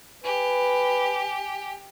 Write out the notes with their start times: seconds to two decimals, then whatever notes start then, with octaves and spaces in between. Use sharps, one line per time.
0.24 G4 B4 G#5